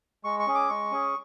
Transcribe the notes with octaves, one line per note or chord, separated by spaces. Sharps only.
G#3 C#6
C#6
C#4 G#4
D6
G#3 C#6
C#4 G#4